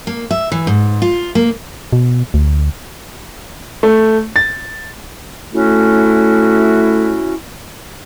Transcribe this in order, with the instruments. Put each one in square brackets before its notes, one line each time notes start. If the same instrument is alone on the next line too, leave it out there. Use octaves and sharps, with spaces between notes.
[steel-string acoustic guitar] A#3
E5
E3
G#2
F4
A#3
[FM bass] B2
D2
[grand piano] A3
A6
[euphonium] A3 [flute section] C#4 E4 F#4